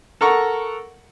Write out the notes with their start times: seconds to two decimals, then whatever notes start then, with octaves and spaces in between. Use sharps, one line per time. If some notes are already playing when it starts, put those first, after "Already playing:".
0.21 A4 A#4 F#5 A#5 C#6